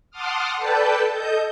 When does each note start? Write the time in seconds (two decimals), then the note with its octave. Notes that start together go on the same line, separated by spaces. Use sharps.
0.11 F#5 A5 C6 D6 D#6 F6
0.57 A4 B4 D5 G5 A5 G6
1.11 A4 D#5 G6